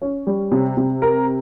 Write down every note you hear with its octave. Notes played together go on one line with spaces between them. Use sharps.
C#4
G3
C3
C3
A#4